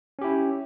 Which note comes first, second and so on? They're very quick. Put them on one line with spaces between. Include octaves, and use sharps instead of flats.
C#4 G4 E4